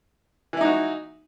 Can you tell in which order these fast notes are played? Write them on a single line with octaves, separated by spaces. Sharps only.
E3 E4 D#4 F#4